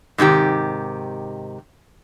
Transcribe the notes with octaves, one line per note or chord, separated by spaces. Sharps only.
G#2 C3 D#3 G4